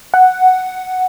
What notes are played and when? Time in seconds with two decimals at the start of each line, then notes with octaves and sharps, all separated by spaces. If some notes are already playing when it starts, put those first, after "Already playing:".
0.14 F#5